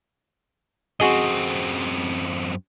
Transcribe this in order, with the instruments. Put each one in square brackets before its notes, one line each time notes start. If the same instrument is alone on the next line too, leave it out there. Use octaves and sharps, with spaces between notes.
[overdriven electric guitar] F#2 C4 [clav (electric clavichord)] F#4 G#4 D#5